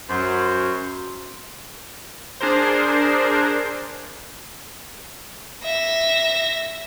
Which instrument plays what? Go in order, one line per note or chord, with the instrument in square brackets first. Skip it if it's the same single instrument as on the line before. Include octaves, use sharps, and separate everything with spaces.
[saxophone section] F#2 [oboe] C5
[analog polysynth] D4 G#4 A#4 C5
[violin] E5 A#6